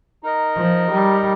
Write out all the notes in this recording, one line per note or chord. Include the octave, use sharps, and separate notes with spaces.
D#4 A#4 D#5
F3
G3